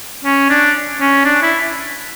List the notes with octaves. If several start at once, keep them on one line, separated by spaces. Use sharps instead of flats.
C#4
D4
C#4
D4
E4